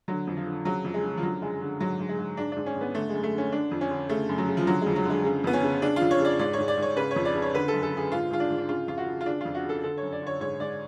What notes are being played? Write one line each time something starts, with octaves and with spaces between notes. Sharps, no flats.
D3 F#3
F2
F3
D3
C#3 F#3
F2
G#3
C#3
F3
D3 F#3
F#2 G#3
D3
G#2 F#3
G#2
G#3
G#2
G#2 D4
G#2 D4
C#4
G#2
B3
D3 A3
F#2 G#3
A3
D3 C#4
D3 D4
F2
C#4
D3
C#3 A3
F#2
F#3
C#3
F3
D3 F#3
F2 G#3
F#3
D3 G#3
C#3
F2 B3
C#4
C#3
C#3 D4
F2 F4
C#5
C#3 D5
G#2 D5
G#2 C#5
D5
G#2
C#5
C#3 B4
C#5
F2
D5
C#3
C#5
D3 B4
A4
F#2
A4
D3 G#4
G#2 F4
G#2 F4
D4
G#2
D4
C#3 F4
F2 F4
F#4
C#3
F4
C#3 D4
F2 F4
F#4
C#3
A4
D3 A4
C#5
F#2
D5
D3 C#5
G#2 C#5
G#2 D5